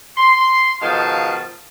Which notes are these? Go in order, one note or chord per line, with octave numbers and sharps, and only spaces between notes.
C6
B2 D#3 F3 G#3 F5 A5